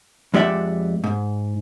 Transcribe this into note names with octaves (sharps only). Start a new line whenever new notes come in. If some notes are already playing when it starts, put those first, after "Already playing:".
F2 G#3 G4 D5 E5 F#5
G#2